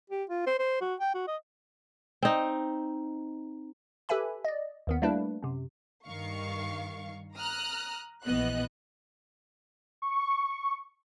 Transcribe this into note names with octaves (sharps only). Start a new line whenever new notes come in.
G4
F4
C5
C5
F#4
G5
F#4
D#5
C4 D#4
G4 A4 B4 E5 G#5 B5
D5 D#5
D#2 D#3 B3
G3 A3 A#3 D4 E4 B4
F#2 C3
G2 D#3 F5 C#6
A#5 D#6 F6 F#6
A#1 E3 B3 D#5 F#6
C#6